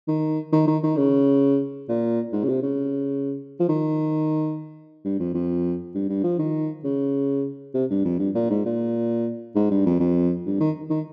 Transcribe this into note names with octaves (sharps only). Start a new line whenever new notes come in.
D#3
D#3
D#3
D#3
C#3
A#2
G#2
C#3
C3
C#3
F3
D#3
G2
F2
F2
G2
G2
F3
D#3
C#3
C3
G2
F2
G2
A#2
G#2
A#2
G#2
G2
F2
F2
G2
D#3
D#3